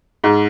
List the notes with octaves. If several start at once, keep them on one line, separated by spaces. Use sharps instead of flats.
G#2